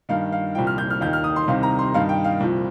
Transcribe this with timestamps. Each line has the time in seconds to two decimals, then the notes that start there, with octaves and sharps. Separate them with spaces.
0.09 G2 D#3 F5
0.32 F5
0.55 C2 A#2 F3 G5
0.67 F6
0.78 G6
0.90 F6
1.01 D#2 D#3 G6
1.13 F6
1.24 D#6
1.36 C6
1.48 C2 C3 D#3 F5
1.63 A#5
1.79 C6
1.94 G2 D#3 F5
2.09 G5
2.24 F5
2.40 C2 A#2 F3